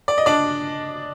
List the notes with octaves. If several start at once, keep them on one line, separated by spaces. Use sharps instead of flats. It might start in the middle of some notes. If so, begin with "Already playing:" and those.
D5
D#5
D4 D5